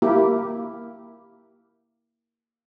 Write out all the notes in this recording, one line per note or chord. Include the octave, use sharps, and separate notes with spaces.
A#3 E4 G4